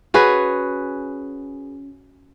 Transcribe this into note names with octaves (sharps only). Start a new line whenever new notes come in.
C#4 F#4 G#4 B4